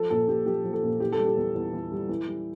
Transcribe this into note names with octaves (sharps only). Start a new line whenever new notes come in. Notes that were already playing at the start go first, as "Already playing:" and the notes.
Already playing: F3 A4
A#2 A4
A#2 G4
F3 G4
F3
A4
A#2
E3 G4
A4
G3
G4
E2
E2
E3
G3
E3
G3